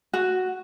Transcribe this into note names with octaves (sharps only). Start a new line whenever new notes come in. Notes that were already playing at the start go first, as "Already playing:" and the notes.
F#4